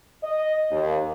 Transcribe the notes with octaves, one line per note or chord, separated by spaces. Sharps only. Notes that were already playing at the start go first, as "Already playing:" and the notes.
D#5
D#2